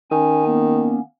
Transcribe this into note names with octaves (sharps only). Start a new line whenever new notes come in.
D#3 C#4 G#5
A#3 B3 C#4